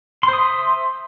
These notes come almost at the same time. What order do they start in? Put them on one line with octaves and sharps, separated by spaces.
C6 C5 D#6 E5